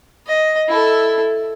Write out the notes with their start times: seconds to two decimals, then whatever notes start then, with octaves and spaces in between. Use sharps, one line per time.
0.27 D#5
0.69 E4 A4